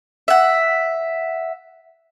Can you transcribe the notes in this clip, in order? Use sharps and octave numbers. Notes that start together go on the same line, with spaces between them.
E5 F#5